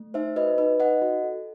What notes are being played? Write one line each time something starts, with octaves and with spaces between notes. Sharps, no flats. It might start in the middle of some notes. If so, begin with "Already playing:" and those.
Already playing: A3
D#4 C5 E5
F#4 B4 D#5
D#4 B4
D#4 D#5 F#5
F#4
A4